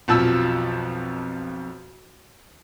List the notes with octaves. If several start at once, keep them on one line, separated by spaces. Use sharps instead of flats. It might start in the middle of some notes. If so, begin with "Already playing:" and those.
B1 F2 F3 A5 E6